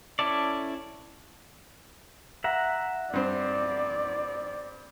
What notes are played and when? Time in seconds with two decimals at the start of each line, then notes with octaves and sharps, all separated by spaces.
0.19 C#4 E4 A4 D5
2.44 E5 F#5 A#5
3.13 G2 C4 D5